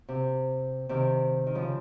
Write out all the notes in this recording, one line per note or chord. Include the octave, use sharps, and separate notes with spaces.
C3
C3 D#3
D#3
C#3 F3